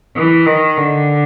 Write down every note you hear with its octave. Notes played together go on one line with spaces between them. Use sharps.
E3
D#3
D3